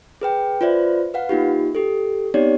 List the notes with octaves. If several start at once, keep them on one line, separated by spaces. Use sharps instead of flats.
G#4 B4 G5
F4 B4 C5 D5 E5
B4 F5 F#5
A#3 D#4 F4 G4
G4 A4
B3 C4 D#4 G4 C#5 D5